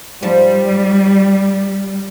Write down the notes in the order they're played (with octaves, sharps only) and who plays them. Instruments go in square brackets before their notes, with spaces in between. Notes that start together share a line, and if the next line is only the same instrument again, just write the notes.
[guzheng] G#2 F3 A5 [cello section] G3